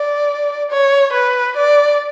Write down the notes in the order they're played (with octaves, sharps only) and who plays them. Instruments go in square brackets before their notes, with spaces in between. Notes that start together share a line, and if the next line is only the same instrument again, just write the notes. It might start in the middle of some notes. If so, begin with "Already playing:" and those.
Already playing: [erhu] D5
C#5
B4
D5